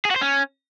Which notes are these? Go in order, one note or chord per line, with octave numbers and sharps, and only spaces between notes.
G#4
F#4
C5
C#4